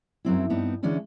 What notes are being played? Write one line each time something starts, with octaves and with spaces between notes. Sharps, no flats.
F#2 F#3 C4 E4
G2 B3 C4 D#4
D3 E3 G#3 C#4 D4 E4